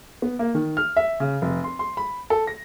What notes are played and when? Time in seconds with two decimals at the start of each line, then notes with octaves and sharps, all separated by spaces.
0.22 B3
0.39 A#3
0.55 D#3
0.77 F6
0.97 E5
1.20 C#3
1.42 F1
1.64 C6
1.79 C6
1.97 B5
2.30 A4
2.47 A#6